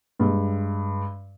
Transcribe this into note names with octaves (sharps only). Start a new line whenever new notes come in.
G2 G#3